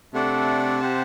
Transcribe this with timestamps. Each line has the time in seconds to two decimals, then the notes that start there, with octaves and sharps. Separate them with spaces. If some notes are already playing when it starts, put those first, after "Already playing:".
0.13 C3 A3 D4 A4 D5 F#5
0.80 G4 C5 F#5 A5